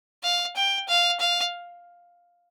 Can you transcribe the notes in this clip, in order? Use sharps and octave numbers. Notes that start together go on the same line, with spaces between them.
F5
G5
F5
F5